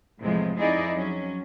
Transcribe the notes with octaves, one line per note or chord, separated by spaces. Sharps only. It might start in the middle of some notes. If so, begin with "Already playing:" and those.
E2 A2 C3 F3 G#3
F2 D#4 E4 G#4 D5 D#5
F3 F#3 C#4